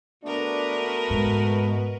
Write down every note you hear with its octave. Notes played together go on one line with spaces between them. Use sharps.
A3 B3 D4 F#4 A#4 B4
G#2 B2